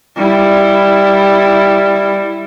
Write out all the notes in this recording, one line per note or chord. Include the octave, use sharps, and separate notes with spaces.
G3 E4